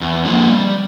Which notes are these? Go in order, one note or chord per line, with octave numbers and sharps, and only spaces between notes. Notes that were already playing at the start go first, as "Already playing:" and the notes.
E2
D3 F3 A#3
G3